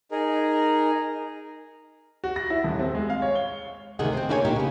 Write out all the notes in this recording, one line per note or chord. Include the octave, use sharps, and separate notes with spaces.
D#4 G#4 A#4
F#4
A#6
E4
D#1
C4
G#3
F5
C#5
G7
D2 C3 D#3 G#4 F#5
C4 C5
A#3 D4 E4 G#4 C#5 G#5
A#2 A#3 D4 D#4 G4
C#3 B3